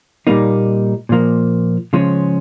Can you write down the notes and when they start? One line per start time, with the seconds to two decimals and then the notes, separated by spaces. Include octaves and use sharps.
0.27 A#2 G3 A#3 D#4
1.09 A#2 F3 A#3
1.93 C#3 F3 G#3 C#4